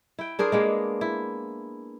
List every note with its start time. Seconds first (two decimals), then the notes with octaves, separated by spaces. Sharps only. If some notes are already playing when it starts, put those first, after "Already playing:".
0.19 E4 G5
0.39 D4 G#4 A#4 C5
0.52 G#3 A#3 B3 G#4
1.01 E4